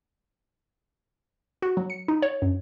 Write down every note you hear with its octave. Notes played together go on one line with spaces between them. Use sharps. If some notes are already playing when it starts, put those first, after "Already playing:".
F#4
F#3
C#7
D#4
C#5
F#2